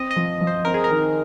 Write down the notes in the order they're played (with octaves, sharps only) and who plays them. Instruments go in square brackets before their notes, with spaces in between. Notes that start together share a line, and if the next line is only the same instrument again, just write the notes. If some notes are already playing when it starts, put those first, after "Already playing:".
Already playing: [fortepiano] C4 [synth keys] D#5
[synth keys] D#5
[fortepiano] F3
F3
[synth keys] C5
[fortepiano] C4 [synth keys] A#4
[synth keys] G#4
A#4
[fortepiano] D#3